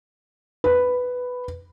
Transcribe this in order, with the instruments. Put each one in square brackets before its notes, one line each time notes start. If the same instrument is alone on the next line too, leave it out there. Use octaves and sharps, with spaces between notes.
[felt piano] B4